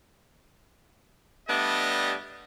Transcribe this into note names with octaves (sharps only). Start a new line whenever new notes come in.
G3 A3 B3 D4 G4 D#5